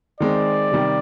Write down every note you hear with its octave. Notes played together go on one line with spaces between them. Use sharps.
D#3 G#3 C4 D5
C3 D#3 G3